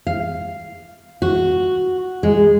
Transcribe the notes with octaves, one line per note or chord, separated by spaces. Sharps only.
F5
F#4
G#3